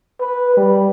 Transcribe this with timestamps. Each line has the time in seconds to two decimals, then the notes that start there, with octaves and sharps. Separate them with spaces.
0.20 B4
0.57 G3